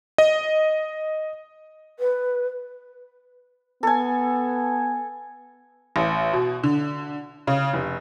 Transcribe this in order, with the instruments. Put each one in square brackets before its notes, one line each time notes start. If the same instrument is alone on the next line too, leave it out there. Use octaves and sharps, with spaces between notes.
[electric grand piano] D#5
[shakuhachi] B4
[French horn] B3 [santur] A4 G#5
[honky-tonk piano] A1
B2
D3
C#3
F1